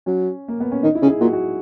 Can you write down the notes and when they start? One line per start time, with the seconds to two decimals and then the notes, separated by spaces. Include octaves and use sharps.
0.06 F#3 C#4
0.48 A#3
0.60 B3
0.72 C#4
0.83 D#3 D#4
0.95 E4
1.02 C#3
1.08 G#4
1.21 A#2 F#4
1.33 F#4